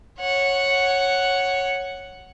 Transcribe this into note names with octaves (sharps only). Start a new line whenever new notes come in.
C#5 F#5